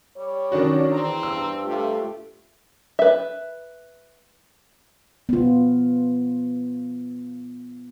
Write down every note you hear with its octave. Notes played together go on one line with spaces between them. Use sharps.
G3 C#5
D#3 F#3 C#4 D4 F#4
E2 C4 A#5
G2 E6
C3 A3 F4 G4
B4 E5
B3 F4